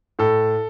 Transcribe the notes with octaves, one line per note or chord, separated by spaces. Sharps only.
A2 A4